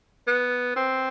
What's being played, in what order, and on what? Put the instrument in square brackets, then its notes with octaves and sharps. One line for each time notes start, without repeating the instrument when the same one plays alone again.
[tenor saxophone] B3
C4